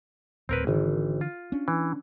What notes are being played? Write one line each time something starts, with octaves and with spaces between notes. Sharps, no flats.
D1 C4 A#4 B4
G#1 D3 E3
F4
C#4 D4
E3